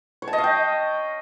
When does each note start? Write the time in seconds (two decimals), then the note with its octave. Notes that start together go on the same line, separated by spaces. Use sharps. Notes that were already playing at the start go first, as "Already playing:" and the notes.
0.22 C#5
0.28 A5
0.33 D#5
0.38 F5
0.44 G5